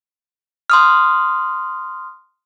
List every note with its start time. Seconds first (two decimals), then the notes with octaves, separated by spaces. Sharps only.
0.70 C6 D#6 F6